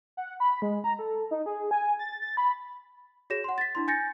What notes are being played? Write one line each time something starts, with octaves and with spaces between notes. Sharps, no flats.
F#5
B5
G#3
A#5
A4
D#4
G#4
G#5
A6
A6
B5
F#4 G#4 C#5 A#6 E7
F#5 C6
A6 B6
D4 E4 C6
G#5 G6 A6 A#6 C#7